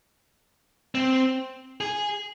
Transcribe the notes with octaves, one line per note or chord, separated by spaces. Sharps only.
C4
G#4